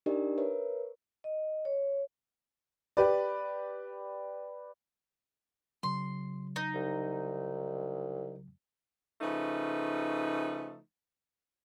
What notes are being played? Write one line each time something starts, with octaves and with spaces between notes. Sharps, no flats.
D4 D#4 G4 A#4 D5 D#5
A#4 B4 C#5 E5
D#5
C#5
G4 B4 D5
C#3 F#3 C6
D#4
C2
C#3 F3 A3 D#4 B4